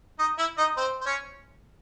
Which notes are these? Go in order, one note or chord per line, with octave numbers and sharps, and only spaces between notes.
D#4 D#5
E4 E5
D#4 D#5
C4 C5
C5
C#4 C#5